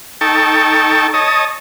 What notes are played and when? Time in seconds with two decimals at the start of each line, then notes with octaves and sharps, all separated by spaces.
0.21 D#4 A4 G5 A5 C#6
1.14 C#5 D#5 A5 D#6